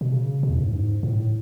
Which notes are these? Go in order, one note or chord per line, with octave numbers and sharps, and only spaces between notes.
B2
C#3
B2
E2
F#2
A2
G#2
A2